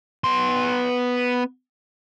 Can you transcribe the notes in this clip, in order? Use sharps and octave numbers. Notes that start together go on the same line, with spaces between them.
B3 C6